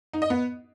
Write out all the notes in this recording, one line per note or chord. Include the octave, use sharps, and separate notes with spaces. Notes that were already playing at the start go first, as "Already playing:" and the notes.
D#4
D#5
B3